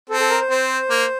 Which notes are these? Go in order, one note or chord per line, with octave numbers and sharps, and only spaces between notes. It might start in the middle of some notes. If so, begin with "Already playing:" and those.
C4 A4
A4
A#4
C5
C4
A#3